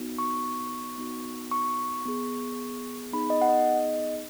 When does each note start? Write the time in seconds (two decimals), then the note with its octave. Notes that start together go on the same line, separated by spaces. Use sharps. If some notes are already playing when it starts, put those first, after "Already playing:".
Already playing: B3 D#4 F#4
0.18 C#6
0.98 B3 D#4 F#4
1.51 C#6
2.06 B3 G#4
3.12 B3 D#4 G#4 B5
3.30 D#5
3.42 F#5
3.49 D#5